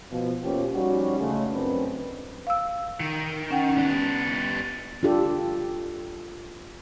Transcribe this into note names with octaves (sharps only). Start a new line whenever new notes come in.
B2 F3
B2 A#3 C#4 F4 G4 C5
F3 G3 C#4 D#4 F#4
C#3 G#3 A3
F#2 A2 C4 D4 B4
F5 E6
D#3
C#4 F#5 G5
B3 D4
D4 F4 G4 A4